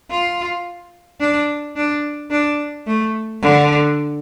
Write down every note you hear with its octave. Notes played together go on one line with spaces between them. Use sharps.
F4
D4
D4
D4
A3
D3